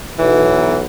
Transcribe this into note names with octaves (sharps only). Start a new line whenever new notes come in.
B1 E3 F#3